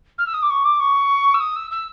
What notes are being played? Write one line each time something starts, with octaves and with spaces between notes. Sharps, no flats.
F6
E6
D#6
D6
C#6
D6
C#6
E6
D#6
E6
E6